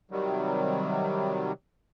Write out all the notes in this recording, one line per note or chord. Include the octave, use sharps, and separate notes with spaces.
C3 D#3 F#3 G3